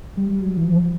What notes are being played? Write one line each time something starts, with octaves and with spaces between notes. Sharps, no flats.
G3
G3
F#3
E3
F3